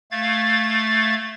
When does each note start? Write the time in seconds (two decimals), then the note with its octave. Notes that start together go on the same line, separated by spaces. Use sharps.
0.11 A3 F5 G#6 A6